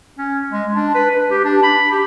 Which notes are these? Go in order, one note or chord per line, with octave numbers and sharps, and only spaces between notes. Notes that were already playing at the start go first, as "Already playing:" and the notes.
C#4
G#3
D4
B4
B4
G4
D4
B5
G4